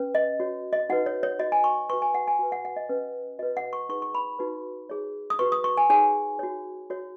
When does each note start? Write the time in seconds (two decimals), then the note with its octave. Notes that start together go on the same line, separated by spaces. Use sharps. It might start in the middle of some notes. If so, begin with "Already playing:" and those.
Already playing: C#4 B4
0.15 D#5
0.40 F#4 C#5
0.73 D#5
0.89 D#4 F#4 B4 F#5
1.06 C#5
1.23 C#5
1.39 F#4 C#5 D#5
1.52 G#5
1.64 C#6
1.89 F#4 B4 C#6
2.02 G#5
2.14 F#5
2.27 G#5
2.39 F#4 B4
2.52 F#5
2.65 F#5
2.76 D#5
2.89 C#4 B4
3.39 F#4 B4 D#5
3.57 F#5
3.73 C#6
3.89 D#4 G#4 B4 C#6
4.02 C#6
4.15 B5
4.39 D#4 F#4 B4
4.89 D#4 G#4 C#5
5.30 D#6
5.39 F#4 B4 C#6
5.52 D#6
5.64 C#6
5.77 G#5
5.90 D#4 G#4 C#5 G#5
6.39 F#4 C#5
6.90 F#4 C#5